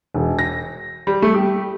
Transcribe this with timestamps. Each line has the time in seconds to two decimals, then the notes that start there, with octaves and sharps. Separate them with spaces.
0.15 E1
0.39 A#6
1.07 G3
1.22 A3
1.35 G4